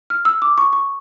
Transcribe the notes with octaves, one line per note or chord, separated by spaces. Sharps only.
F6
E6
D6
C#6
C#6